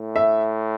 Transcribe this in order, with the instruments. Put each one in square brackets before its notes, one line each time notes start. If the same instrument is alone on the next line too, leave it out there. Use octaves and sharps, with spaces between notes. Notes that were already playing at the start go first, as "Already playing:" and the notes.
Already playing: [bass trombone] A2
[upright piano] E5